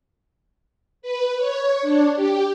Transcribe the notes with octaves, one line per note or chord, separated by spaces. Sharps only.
B4
C#5
D4
G4